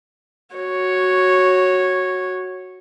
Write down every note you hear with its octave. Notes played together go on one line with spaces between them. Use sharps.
F#4 C#5